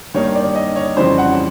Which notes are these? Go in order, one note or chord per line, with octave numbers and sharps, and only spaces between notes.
G2 D#3 G3 A#3 D#4 C#5
D5
D#5
C#5
F2 C#3 E3 G3 C4 C5
F#5